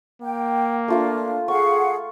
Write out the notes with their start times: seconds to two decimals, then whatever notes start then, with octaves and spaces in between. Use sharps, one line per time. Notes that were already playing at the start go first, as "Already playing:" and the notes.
0.22 A#3 G5
0.88 A3 D4 F4 F5
1.48 G#4 F5 F#5 C#6